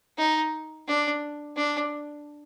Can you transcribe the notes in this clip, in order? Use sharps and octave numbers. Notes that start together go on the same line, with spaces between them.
D#4
D4
D4